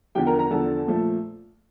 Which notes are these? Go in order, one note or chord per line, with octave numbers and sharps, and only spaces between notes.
E2 D3 F3 G4 G5
A#4 A#5
A#4 A#5
E2 D3 F3 A4 A5
A#2 F3 A3